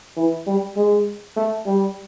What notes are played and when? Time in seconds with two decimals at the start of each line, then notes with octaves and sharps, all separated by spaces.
0.17 E3
0.47 G3
0.76 G#3
1.36 A3
1.66 G3